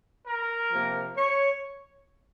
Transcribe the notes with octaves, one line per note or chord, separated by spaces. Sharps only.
A#4
C3 F3 A#3
C#5